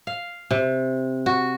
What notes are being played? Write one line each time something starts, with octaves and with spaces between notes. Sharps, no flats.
F5
C3
F#4